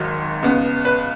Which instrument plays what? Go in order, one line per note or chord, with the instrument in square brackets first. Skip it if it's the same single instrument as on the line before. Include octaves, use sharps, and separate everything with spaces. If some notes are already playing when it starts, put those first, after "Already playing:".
Already playing: [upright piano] G#1 G#2 D#3 F#3
C#2 C#3 B3
B4